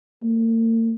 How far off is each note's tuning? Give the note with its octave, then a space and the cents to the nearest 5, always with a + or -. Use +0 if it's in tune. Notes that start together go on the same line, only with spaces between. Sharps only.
A#3 -45